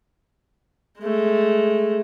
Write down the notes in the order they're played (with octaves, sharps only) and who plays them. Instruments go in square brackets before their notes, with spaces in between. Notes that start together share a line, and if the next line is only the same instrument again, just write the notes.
[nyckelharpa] G#3 A3